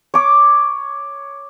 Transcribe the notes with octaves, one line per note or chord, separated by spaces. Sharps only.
C#5 D6